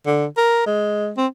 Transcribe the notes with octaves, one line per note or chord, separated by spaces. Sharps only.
D3
A#4
G#3
C4